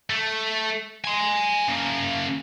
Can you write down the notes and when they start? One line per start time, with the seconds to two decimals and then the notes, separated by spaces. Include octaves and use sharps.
0.10 A3
1.05 G#5 C6
1.68 C#3 A#3